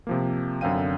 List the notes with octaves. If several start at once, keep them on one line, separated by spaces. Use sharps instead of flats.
C3 F3 A#3
F#2 D3 C4 F5 G5 D#7